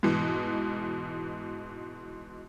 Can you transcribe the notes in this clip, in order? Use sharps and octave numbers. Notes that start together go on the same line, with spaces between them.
G#2 B2 E3